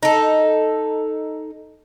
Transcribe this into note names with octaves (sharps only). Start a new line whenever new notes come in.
D#4 A4